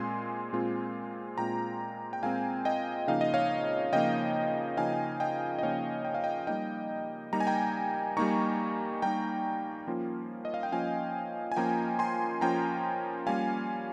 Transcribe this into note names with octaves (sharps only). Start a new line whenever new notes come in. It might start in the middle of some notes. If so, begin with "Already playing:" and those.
Already playing: A#2 G#3 C4 F4 G#5 C6
A#2 G#3 C4 F4
A#2 G#3 C4 F4 G5 A#5
G5
A#2 G#3 C4 F4 F5 G#5
D#5 G5
C#3 F3 A#3 D#4 F5
D#5
C#5 F5
C#3 F3 A#3 D#4 D#5 G5
C#3 F3 A#3 D#4 F5 G#5
D#5 G5
D#5
C#3 F3 A#3 D#4 C#5 F5
G5
F5
D#5 G5
G3 A#3 D#4 D#5 G5
G3 A#3 D#4 A#5
G#5
G5 A#5
G3 A#3 D#4 A#5 C#6
G3 A#3 D#4 G5 A#5
F3 A#3 C#4 F4
D#5
F5
G5
F3 A#3 C#4 F4 F5 G#5
G#5
F3 A#3 C#4 F4 G5 A#5
G#5 C6
F3 A#3 C#4 F4 G5 A#5
G3 A#3 C#4 F4 F5 G#5